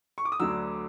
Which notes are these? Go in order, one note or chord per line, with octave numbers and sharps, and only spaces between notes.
C#6
D6
D#6
D2 D3 F#3 E6